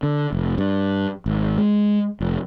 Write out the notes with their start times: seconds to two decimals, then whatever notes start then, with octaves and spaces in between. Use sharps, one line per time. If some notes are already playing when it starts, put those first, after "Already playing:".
0.03 D3
0.32 F1
0.58 G2
1.26 G#1
1.58 G#3
2.21 F1